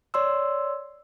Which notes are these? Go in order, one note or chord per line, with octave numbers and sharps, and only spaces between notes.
C#5 D5 C6 E6